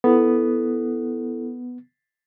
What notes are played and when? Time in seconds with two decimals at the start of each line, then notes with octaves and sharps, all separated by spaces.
0.04 B3 E4 A4